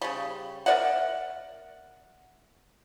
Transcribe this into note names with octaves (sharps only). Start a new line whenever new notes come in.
C#3 G3
A#4 D5 E5 F#5